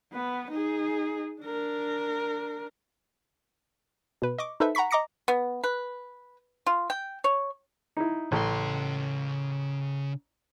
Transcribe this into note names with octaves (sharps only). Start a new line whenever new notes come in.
B3 B4
D#4 G#4
D4 A#4
B2 B4
D#5 C#6 D6
D#4 A4 B4 C5 E5
F#5 A#5 B5 C#6 B6
D#5 A#5 D6 A#6 C#7
B3
B4
F4
G5
C#5
D#4 E4
A1 C#3 C6